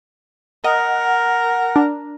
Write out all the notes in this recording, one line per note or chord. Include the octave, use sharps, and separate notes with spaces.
A#4 D#5 F#5
D4